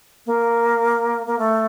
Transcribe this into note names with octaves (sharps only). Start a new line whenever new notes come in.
A#3
A#3
A3